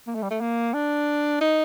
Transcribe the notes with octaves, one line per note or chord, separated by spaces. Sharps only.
A#3
A3
G3
A3
A#3
D4
D#4